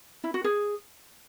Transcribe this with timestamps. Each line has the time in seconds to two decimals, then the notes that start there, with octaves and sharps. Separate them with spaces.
0.24 E4
0.34 F#4
0.44 G#4